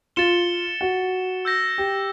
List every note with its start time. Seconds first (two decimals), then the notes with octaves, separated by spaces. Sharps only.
0.16 F4 A6 C#7 E7 G7
0.81 F#4
1.45 E6 G6 A#6
1.78 G4